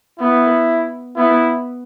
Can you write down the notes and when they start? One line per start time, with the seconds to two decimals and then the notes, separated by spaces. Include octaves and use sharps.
0.19 B3 E4
1.16 B3 E4